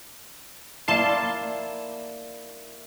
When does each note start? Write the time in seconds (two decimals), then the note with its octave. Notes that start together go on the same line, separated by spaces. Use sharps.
0.88 A#3 E4 D5 F5 A5 C6